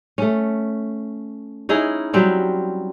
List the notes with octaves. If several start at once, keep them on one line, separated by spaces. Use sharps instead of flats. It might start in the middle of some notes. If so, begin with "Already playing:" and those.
A3 C#4
C#4 D#4 E4 G#4
F#3 G3 C4 C#4